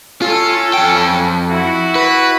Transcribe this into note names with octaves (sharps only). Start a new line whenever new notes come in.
C#4 F4 A4
F2 G5
E4 F#4
B4